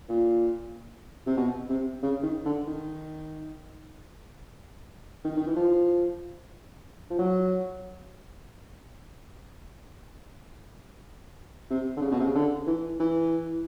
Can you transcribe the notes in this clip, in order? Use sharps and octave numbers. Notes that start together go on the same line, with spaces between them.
A#2
C3
B2
C3
C#3
D#3
D3
D#3
D#3
D#3
E3
F3
F3
F#3
C3
D3
C#3
B2
C3
C#3
D3
E3
E3